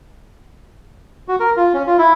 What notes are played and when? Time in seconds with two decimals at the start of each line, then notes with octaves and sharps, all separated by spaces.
1.28 F#4
1.40 A#4
1.57 F4
1.74 C#4
1.87 F4
1.98 E4